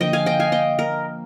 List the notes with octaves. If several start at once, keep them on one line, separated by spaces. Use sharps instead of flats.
D3 F3 A#3 D#5 G5
F5 G#5
D#5 G5
F5 G#5
D#5 G5
A#4